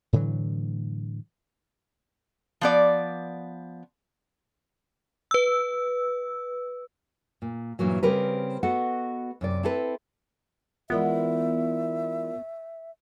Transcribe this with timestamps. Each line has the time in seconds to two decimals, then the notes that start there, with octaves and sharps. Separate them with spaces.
0.13 A2 D3 E3 F#3
2.61 F3 B3 D5
5.31 B4 E6
7.42 A#2
7.79 G2 A#2 E3 F#3
8.03 C#3 G3 C4 A#4 B4
8.63 B3 F#4 A4 D#5 F#5
9.41 F#2 C3 D5
9.63 C4 E4 A4 B4
10.90 E3 G#3 B3 E4 F4 A#4 D5 E5